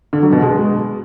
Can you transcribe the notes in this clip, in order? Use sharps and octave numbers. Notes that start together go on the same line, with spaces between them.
D3
F#3
B2
G#3